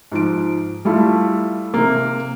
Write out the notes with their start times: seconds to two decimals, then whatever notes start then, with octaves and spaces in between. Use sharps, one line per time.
0.12 G#2 F3 D7
0.85 G3 A3 E4 F4
1.74 C3 A#3